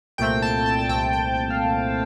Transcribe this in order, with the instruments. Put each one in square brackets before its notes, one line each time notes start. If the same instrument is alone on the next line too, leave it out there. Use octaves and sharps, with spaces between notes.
[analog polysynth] C2 A#2 A3 C4 G5
A5
A5
A5
C2 A#2 A3 C4 G5
G5
G5
F5